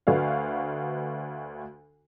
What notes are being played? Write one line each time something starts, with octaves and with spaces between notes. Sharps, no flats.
D2 F#4 B4 F5